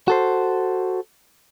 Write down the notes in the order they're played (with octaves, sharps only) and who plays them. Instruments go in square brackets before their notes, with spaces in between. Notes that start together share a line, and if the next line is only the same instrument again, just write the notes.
[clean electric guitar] F#4 A4 C5